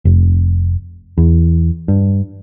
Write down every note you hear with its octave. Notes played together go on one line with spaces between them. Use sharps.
F1
E2
G2